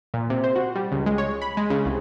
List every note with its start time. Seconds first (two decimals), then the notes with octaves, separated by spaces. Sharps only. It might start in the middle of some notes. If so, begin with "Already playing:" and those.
0.14 A#2
0.30 C3
0.44 C5
0.56 F#4
0.76 G3
0.92 C#2
1.06 G#3
1.18 C#5
1.42 B5
1.57 G#3
1.70 C#3
1.85 C2